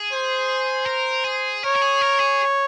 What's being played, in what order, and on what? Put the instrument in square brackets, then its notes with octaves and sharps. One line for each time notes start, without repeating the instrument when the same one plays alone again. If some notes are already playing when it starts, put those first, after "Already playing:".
Already playing: [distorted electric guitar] G#4
[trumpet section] C5
[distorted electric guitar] A#4
G#4
[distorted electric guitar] A#4 [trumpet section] C#5
[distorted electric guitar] A#4
G#4
A#4
G#4